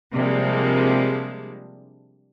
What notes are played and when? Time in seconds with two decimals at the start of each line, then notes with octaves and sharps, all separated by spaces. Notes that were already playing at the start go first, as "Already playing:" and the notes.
0.14 C3 F3 G3 G#3 A#3 D4